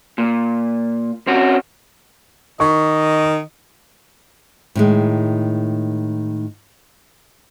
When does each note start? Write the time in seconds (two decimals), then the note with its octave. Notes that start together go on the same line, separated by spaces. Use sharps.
0.18 A#2
1.27 C4 C#4 F#4
2.60 D#3 D#5 C#6
4.75 A2 D#3 G#3